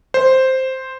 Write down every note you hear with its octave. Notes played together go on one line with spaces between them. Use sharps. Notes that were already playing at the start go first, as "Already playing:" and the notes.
C5